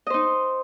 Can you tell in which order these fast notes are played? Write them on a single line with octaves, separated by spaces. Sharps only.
D#5 C5 D#4